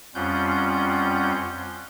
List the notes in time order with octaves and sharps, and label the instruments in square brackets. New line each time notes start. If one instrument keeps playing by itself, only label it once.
[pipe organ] F2 G3 C#4 F4 F#5 G6